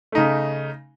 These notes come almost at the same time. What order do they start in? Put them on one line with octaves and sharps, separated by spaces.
A3 D#4 C#3